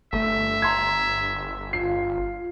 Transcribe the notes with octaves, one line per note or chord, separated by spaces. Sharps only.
G1 A3 E5
A#5 C6 G#6
F4 C7